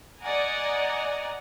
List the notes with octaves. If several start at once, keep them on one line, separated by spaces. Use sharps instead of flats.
D5 D#5 F#5 G#5 A#5